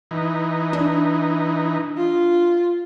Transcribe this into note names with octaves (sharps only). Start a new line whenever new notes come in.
E3 D#4
D4
F4